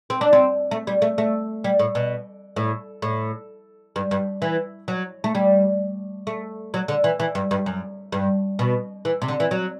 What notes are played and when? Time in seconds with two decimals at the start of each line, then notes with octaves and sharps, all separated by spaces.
0.10 C4
0.21 D4
0.33 C4
0.71 A3
0.87 G3
1.02 A3
1.18 A3
1.64 G3
1.79 A2
1.95 B2
2.56 A2
3.02 A2
3.96 G2
4.11 G2
4.42 E3
4.88 F#3
5.24 A3
5.35 G3
6.27 A3
6.74 F#3
6.88 D3
7.04 E3
7.20 E3
7.35 G2
7.51 G2
7.66 F#2
8.12 G2
8.59 B2
9.05 E3
9.22 C3
9.28 D3
9.40 E3
9.51 F#3